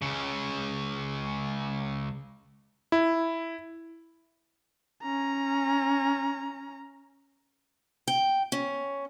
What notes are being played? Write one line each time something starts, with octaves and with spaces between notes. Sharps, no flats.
C#2 C#3
E4
C#4 A#5
G5
C#4